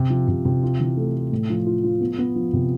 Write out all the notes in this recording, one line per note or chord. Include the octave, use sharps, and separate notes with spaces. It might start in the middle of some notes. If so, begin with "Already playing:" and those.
Already playing: C3
F3
C3
C3
F4
E3
A3
A3
A2
F3
F4
F3
B3
B3
F3
C3